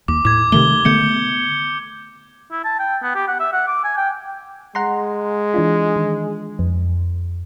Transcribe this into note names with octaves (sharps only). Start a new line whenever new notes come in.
D#2 D6
A2 D6 G#6
C3 D#3 A3 G7
D3 A3 B3 G6 C#7
E4
A5
G5
B3
G4
F#5
E5
F#5
D6
G#5
G5
G#3 F#5 A#5 C6
E3 D4 F4
D#3
F2